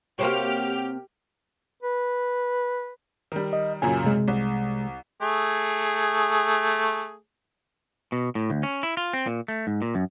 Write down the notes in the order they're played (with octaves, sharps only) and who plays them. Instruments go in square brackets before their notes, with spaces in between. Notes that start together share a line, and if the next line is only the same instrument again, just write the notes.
[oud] C3 A#3 [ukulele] F#4 C5 C#5 [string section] G4 F6
[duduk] B4
[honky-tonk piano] D#3 G3
[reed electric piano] D#5
[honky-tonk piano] F#2 A#2 C#3 [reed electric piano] G#5
[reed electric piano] C3 G#3
[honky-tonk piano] C2
[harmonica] A3 G#4
[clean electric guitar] B2
A2
D2
C#4
E4
F4
C4
A#2
A3
G#2
A#2
F#2